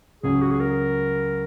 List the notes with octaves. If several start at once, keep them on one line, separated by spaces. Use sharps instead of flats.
C#2 C#3 F#3 C#4 G#4
F#4
G#4
A#4